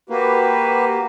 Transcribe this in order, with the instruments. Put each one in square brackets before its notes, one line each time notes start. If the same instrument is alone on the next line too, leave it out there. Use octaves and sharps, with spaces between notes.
[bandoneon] A#3 [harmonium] F#4 G4 B4